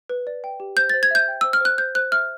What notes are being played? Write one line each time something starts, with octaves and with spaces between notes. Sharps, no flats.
B4
D5
G5
G4
C5 G6
A6
C5
G#6
E5 G6
G5
C5 E6
F6
C5 F#6
C5 G6
C5 F#6
E5 F6